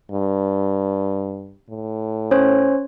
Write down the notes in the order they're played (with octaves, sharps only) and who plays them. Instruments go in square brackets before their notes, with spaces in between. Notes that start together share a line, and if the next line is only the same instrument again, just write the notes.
[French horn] G2
A2
[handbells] C#4 C5 C#5